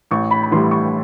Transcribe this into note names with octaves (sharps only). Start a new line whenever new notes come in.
A1 C#6
B5
B5
A2 E3 G3 C6
C#6